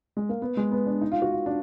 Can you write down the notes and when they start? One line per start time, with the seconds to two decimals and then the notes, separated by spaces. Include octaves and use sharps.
0.17 G#3
0.29 A#3
0.42 B3
0.57 G#3
0.71 B3
0.86 D4
1.01 D#4
1.12 F4
1.22 F#4
1.32 F4
1.46 D4